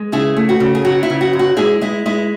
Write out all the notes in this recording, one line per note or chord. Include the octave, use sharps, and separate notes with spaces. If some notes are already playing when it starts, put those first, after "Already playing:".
Already playing: G#3
C#3 E4 G#4
A3
F#4
C#3
G#4
F#3 F#4
E4
C#3
F#4
F#2
F#4
G#3 E4 G#4
G#3 E4
G#3 E4